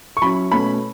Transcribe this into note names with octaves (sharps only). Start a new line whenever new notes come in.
C#6
F#3 C#4 E4 B5
B2 A3 C#4 B5